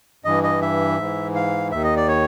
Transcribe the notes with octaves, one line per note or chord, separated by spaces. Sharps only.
G2 E3 D#5
D#5
E5
G#2 E3
F5
D#2 D#3 E5
D#5
D5
C#5